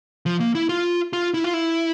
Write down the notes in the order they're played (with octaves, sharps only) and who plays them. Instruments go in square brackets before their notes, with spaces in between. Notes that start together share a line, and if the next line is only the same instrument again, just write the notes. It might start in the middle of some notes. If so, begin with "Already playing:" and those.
[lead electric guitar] F3
A#3
E4
F4
F4
E4
F4
E4